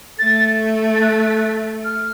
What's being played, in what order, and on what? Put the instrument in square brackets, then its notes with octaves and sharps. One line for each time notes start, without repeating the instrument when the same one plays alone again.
[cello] A3 [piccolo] A6
[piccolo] A6
F#6
F6